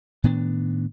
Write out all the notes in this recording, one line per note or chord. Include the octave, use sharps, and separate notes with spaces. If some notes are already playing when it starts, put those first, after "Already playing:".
A2 D#3 B3 D4